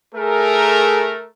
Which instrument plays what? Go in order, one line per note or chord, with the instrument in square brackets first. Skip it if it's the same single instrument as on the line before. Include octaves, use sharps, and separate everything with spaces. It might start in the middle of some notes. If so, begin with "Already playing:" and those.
[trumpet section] A3 A#4 [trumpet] G#4